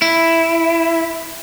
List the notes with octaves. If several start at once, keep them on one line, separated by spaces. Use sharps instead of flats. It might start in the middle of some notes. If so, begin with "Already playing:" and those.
E4